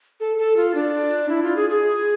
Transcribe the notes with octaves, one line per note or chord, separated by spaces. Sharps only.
A4
A4
F4
D4
E4
F4
G#4
G#4